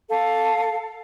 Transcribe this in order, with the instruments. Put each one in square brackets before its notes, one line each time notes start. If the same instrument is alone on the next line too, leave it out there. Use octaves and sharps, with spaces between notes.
[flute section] A4 F5